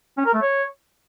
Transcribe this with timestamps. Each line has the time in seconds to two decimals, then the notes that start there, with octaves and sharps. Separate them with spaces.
0.18 C#4
0.26 A#4
0.34 A3
0.42 C#5